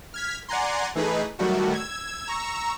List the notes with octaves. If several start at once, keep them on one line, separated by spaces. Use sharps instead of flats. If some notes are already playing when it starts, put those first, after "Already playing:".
F6 G#6 B6
D5 F#5 G#5 A#5 C6
E3 A3 D#4 G#4 B4
D#3 F#3 G3 A3 F#4
E6 G#6
A#5 C#6 E6